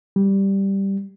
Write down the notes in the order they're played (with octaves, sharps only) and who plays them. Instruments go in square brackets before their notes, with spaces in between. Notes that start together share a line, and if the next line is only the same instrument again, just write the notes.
[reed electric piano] G3